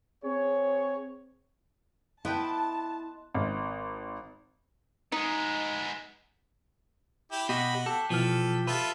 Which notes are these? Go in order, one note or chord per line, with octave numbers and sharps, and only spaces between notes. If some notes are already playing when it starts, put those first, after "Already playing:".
C4 G#4 C#5
B3 E4 B4 D#5 G5 A5 C6 F#6
G#1
G#3 B3 D#4
E4 G4
B2 F#4 G4 D#5 B5
G4 A4
B2 E3 F3 A4 F6
F4 A4 B4 E5